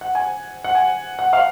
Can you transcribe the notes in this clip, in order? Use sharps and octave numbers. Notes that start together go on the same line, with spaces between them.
F#5
G#5
F#5
G#5
F#5
F5